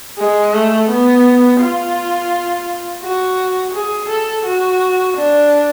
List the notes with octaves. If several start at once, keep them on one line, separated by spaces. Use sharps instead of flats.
G#3
A3
B3
F4
F#4
G#4
A4
F#4
D4